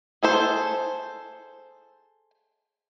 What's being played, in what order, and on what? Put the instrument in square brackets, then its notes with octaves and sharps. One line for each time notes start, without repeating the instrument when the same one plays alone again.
[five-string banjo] G#4 A4 C5